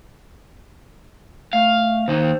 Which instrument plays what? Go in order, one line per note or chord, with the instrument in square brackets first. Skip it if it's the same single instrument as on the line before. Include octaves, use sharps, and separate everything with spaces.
[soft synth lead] A3 [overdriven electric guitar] F5
[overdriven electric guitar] D#2 D#3 [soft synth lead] C5